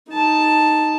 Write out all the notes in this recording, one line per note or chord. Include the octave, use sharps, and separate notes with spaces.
D#4 A5